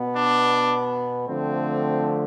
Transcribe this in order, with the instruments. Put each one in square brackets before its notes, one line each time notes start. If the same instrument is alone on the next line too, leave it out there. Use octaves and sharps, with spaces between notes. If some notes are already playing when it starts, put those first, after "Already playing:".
Already playing: [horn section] B2 B3
D4
D3 F3 A3 C4